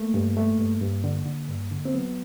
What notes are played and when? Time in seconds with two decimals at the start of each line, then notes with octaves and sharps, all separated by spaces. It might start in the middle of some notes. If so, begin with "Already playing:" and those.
Already playing: A3 A#3
0.14 G2
0.37 A3
0.59 G2
0.81 G2
1.04 D3
1.26 D3
1.48 G2
1.71 D3
1.85 C4
1.94 F#3 B3